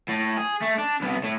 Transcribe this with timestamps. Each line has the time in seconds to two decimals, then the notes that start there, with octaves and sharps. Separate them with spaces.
0.09 A2
0.37 G#4
0.61 A3
0.78 D4
1.01 C2 B2
1.23 A2